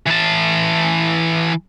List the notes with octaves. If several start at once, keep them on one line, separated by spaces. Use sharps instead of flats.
E3 A5